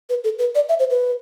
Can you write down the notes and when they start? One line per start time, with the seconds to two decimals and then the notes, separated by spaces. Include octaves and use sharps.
0.10 B4
0.24 A4
0.39 B4
0.55 D5
0.69 E5
0.79 C5
0.90 B4